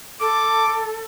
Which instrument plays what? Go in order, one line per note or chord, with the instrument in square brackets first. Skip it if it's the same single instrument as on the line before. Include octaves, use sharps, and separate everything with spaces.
[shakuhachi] A4 [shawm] D6